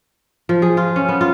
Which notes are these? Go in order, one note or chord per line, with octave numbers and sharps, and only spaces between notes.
F3
G#4
F4
C#4
B3
F4